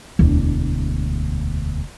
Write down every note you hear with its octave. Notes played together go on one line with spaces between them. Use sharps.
E1 D2